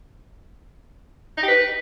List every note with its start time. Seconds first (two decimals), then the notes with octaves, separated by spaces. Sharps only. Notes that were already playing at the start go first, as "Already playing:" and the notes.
1.38 D#4
1.43 G4
1.48 B4